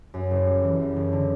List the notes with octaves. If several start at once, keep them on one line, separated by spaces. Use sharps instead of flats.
F#2
F#1
G3
E3
F#2
F#1
D3